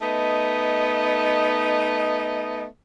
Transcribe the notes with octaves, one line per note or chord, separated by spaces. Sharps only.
A3 B3 D#4 D#5